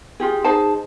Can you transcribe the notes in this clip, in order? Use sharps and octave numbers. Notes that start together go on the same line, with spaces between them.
F4 G4 G#4
D#4 G#4 C5 A5